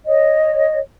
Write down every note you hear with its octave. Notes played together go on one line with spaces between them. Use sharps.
C#5 D#5